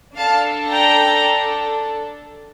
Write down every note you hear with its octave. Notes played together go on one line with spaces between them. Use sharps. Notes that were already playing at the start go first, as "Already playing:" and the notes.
D4 A4 F5 A5
G5 A#5